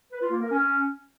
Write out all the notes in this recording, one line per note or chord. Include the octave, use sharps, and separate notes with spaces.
B4
F4
A#3
A#4
C#4